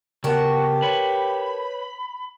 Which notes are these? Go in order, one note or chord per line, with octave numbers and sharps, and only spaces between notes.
C#3 B3 F#4 G4 A#4 A5 C#6
B4 C#5 B5